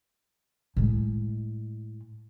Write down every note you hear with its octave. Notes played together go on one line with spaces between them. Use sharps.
A2 G#3